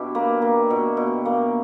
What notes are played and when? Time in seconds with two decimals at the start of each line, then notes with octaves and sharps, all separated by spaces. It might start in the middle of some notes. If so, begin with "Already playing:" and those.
Already playing: B2 D4 E4 G4
0.15 A#3 B4
0.42 A#3
0.70 B2
0.97 B2
1.25 A#3